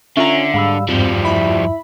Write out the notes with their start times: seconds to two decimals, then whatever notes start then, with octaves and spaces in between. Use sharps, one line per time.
0.17 D3 C#4 F4 E5 A#5
0.54 G#2 G3 F5 B5 E6
0.89 E2 G2 F3 G3 C4
1.25 E4 B5